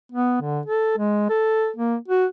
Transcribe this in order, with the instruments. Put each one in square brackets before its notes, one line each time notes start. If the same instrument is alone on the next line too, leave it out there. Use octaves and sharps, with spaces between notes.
[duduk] B3
D3
A4
G#3
A4
A#3
F#4